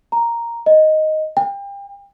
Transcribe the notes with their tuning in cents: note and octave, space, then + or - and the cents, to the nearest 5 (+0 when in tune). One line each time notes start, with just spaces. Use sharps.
A#5 +0
D#5 +0
G5 +30